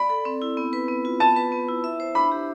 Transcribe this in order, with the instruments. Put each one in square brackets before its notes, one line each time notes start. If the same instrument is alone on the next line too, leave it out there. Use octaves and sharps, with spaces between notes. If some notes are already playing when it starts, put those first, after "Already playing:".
Already playing: [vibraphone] D5 [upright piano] B5
[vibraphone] A4
C4
E4
B3
B4
B3
F4
[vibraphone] B3 [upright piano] A5
[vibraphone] B4
B3
E4
E5
C5
[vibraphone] D4 [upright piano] B5
[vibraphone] G4